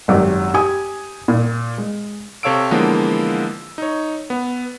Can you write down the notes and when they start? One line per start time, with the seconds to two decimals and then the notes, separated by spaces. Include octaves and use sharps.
0.08 G#1 F#2 G4 D5
0.54 G4 G#5 D#6
1.28 A#2
1.78 G#3
2.43 C3 A4 C#5 F5 E6 D7
2.71 D3 E3 F3 G#3 A#3 B3
3.78 D#4 C#5
4.30 B3